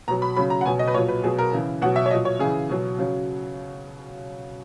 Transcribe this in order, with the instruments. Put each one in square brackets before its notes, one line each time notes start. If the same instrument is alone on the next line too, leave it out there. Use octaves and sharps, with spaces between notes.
[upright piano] B2 F#3 A#5
B5
C#3 F#3 B5
A#5
F#5
B2 F#3 G#5
D#5
B4
A#2 F#3 C#5
B4
B2 F#3 G#4
A#4
C#3 E3
B2 F#5
F#3
E5
C#5
A#2 F#3 D#5
C#5
C#3 E3 G#4
B2 F#3
C#3 F#3